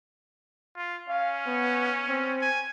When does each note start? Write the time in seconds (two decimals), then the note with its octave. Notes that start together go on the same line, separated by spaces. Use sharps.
0.77 F4
1.09 C#4 F5
1.46 B3
2.08 C4
2.41 G#5